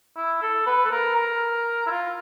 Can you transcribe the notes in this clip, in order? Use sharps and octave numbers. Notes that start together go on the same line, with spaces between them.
E4
A4
B4
A4
A#4
A#4
E4
F4